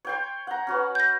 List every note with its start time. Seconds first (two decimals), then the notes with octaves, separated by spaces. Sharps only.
0.05 C#5 G5 C6
0.47 F#5 A#5
0.67 C#4 F#4 B4
0.95 G6 A#6